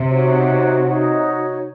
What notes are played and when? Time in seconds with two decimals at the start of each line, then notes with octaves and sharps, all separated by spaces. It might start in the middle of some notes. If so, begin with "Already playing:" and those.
Already playing: C3
0.09 D#4 F#4 C#5
0.86 D#4 F#4 C#5